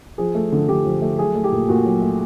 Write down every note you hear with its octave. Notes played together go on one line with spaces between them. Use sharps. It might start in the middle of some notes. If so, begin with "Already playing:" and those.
F3 G#4
A3
D3
D3 G4
F3
A3
F#3 G#4
A3
G4
A#2
A#2 F#4
F#3
A3